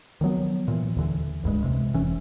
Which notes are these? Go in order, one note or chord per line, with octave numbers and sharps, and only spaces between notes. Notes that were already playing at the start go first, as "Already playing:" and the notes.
D#3 F3 F#3 B3
A#2 E3
D#2 D3 E3
D#1 C#2 G2 G#3
E2 G2 C3 G#3
F1 E3 C#4